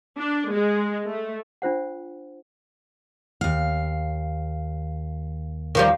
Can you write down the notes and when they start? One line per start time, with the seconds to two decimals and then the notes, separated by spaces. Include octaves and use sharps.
0.18 D4
0.52 G#3
1.07 A3
1.62 D4 F4 C5 F#5
3.41 D#2 F5
5.75 D#3 F3 G3